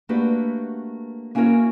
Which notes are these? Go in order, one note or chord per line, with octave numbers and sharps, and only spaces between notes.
A3 A#3 D4 F#4 G4 B4
A#3 C#4 E4 F#4 A#4 C#5